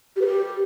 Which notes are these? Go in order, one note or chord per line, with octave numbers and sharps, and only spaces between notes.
G4
B4
G4